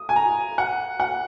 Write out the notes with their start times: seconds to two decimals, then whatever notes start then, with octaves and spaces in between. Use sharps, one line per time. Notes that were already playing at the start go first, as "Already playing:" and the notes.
Already playing: D#6
0.09 G#5
0.16 A#5
0.58 F#5
1.00 F#5